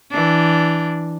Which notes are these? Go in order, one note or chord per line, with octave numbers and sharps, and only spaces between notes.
E3 D4